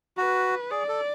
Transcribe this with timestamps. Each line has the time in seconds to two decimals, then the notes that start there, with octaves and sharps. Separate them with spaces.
0.17 F#4 B4
0.71 G#4 D5
0.88 A4